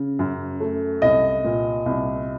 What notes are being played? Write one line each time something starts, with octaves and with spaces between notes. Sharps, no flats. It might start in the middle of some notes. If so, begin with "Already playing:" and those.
Already playing: C#3
F#2
A3
C2 D#5
A#2
C2